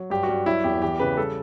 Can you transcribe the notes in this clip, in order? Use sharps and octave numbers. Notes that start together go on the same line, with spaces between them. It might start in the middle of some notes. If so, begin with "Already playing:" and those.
Already playing: F#3
G2 G4
F#4
G2
F#3 E4
E2 G4
E3 G4
C#3 B4
G3 A4